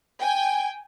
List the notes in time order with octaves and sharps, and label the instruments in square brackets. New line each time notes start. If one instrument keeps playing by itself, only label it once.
[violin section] G5 G#5